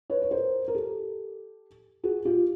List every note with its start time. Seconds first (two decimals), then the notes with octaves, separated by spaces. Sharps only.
0.10 B4 C#5
0.22 C#5
0.31 A#4 C5
0.68 A#4
0.75 G4 A4
2.04 F#4 G#4
2.25 F4 G4